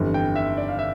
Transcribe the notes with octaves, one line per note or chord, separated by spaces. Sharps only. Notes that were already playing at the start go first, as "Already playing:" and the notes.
Already playing: G1 F2 E3 G3
G5
E5
D5
F5
E5